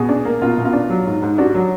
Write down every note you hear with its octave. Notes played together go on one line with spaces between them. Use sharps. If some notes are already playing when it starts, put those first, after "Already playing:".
Already playing: B2 G#4
D4
A#3
B2 F4
B2
F4
D4
F#3
G#2
G#2
D4 F#4
F#3